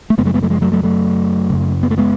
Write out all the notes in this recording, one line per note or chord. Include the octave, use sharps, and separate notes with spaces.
A3
F#2 C#3 G#3 B3
F#3 A3
G#3 B3
F#3 A3
F3 G#3
F#3 A3
F#3 A3
F#3 A3
F#2 C#3
B3
A3
G#3 B3